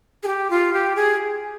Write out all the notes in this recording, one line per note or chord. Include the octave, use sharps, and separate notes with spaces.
G#4
G4
F4
G4
G#4